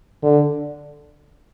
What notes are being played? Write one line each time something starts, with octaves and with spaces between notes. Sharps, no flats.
D3